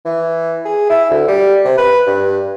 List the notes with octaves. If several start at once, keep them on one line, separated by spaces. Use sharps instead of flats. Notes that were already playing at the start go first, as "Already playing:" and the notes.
E3
G#4
E4
D2
G3
C3
B4
G2